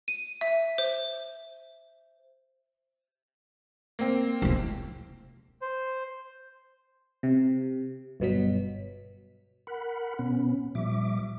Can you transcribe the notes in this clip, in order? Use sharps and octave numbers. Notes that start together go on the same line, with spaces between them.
D#7
E5
C5
A#3 C4
E1 C#2
C5
C3
G1 B2 F#3 B6
A#4 F#5 B5
B2 B3 C#4
A#2 F3 G3 E5 D6